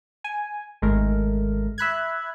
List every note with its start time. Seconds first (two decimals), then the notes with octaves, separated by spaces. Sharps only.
0.24 G#5
0.82 G#1 G#3 A3 A#4
1.78 E5 B5 F#6 G#6